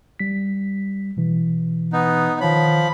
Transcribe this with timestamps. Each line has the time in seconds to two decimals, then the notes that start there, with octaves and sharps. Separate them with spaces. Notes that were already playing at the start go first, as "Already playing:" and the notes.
0.19 G3 B6
1.17 B2 E3
1.93 B3 D#4
2.41 D#3 F3 C#5 B5